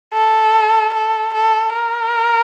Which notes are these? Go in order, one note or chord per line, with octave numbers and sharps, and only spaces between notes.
A4
A4
A4
A#4